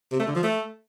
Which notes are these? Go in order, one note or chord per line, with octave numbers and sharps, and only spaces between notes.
C3
A3
D3
F3
A3